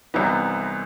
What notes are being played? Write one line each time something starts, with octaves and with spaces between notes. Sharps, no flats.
C2 C3 E3 B3 D#4